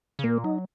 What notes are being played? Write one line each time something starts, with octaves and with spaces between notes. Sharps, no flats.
C#3
A#2 A#3
F#3 D#4